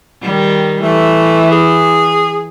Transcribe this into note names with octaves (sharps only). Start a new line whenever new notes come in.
D#3 G3
E3 A3
G#4